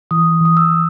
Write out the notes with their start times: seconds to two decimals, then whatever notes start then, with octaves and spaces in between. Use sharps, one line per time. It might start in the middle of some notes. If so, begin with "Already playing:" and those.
0.11 E3 D#6
0.41 E3 D#6
0.57 E6